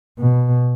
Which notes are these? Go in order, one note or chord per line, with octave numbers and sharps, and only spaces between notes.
B2